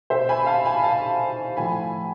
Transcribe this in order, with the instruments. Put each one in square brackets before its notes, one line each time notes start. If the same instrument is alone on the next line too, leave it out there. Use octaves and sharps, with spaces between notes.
[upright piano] B2 C5 E5
G#5 B5
F5 A5
G#5 B5
F5 A5
A2 F3 G#5 B5